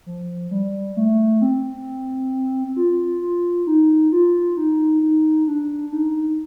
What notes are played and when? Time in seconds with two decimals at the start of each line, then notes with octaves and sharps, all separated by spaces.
0.06 F3
0.51 G3
0.97 A3
1.42 C4
2.76 F4
3.22 F4
3.67 D#4
4.12 F4
4.57 D#4
5.02 D#4
5.48 D4
5.92 D#4